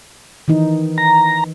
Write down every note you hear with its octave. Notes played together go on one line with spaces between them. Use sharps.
D#3 E3 D#4
A#5